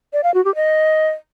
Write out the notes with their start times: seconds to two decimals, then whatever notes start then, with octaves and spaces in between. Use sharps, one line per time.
0.13 D5
0.24 F5
0.34 F#4
0.45 G4
0.55 D#5